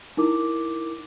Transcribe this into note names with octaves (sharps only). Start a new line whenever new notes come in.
D#4 E4 A#4 D6